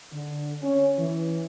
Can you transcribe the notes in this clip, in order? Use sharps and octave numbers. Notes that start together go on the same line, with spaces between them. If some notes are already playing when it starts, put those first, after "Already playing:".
D3
C#4
E3